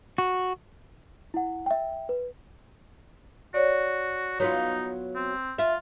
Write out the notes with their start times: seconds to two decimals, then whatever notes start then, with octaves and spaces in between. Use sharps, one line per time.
0.18 F#4
1.34 E4 F#5
1.66 E5 G5
2.09 B4
3.54 F#4 C#5 D5
4.40 F#3 B3 D#4 F4
5.15 C4
5.58 F4 E5